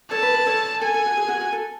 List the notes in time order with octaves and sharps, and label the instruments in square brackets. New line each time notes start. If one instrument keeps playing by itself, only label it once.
[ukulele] A4 C#5 [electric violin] A5
[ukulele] B4
B4
A4 C#5
[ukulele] A4 [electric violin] G#5
[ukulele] A4
F#4
G#4
F#4
G#4
F#4
A4